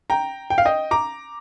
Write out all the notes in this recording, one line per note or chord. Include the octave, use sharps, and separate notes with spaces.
G5 A#5
G5
F5
D#5 G5
A#5 D6